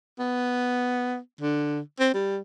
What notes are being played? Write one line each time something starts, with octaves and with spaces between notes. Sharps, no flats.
B3
D3
C4
G3